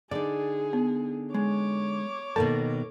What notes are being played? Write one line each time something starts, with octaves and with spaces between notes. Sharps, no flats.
D3 D#4 G#4 D5
B3
G#3 C#5 D6
B2 D#3 A#3 A4 A5